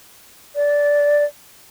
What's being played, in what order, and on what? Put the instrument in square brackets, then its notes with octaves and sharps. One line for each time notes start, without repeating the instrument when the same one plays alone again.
[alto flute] D5